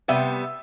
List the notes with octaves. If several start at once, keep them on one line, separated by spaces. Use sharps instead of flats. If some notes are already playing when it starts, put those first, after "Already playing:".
C3 G3 B3 E5